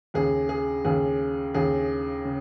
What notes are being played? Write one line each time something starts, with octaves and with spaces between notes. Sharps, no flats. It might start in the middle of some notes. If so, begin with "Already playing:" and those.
D#2 C#3 G#4
G#4
D#2 C#3 G#4
D#2 C#3 G#4
C#3